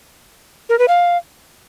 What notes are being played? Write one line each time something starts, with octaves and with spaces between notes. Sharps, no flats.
A#4
B4
F5